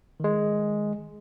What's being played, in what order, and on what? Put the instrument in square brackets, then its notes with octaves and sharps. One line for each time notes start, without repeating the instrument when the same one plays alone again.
[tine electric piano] D#3 G#3